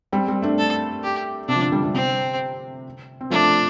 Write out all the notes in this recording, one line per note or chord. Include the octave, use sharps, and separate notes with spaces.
G3 C4
G3 C4
A3 D4
A4
G4
C3 D4
F3
D3
D3 G3
D3 G3
C3 C4
C4
F3 A3 D4